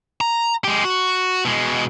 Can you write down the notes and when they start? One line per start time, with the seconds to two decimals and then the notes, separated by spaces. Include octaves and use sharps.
0.21 A#5
0.64 G#3 G4
0.84 F#4
1.45 B2 G#3